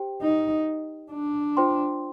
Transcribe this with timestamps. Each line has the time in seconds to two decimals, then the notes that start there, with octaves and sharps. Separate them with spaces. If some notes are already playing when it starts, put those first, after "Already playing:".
Already playing: G4 C5 G5
0.22 D#4
1.12 D4
1.57 F4 C5 G5 C6